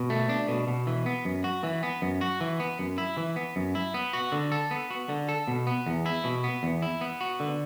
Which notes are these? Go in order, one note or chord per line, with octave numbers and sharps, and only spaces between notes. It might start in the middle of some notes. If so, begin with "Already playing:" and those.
Already playing: B2
A3
D4
B2
B2
E3
B3
F#2
F#4
E3
B3
F#2
F#4
E3
B3
F#2
E4
E3
B3
F#2
E4
B3
F#4
D3
A4
B3
F#4
D3
A4
B2
B3
E2
E4
B2
B3
E2
E4
B3
F#4
D3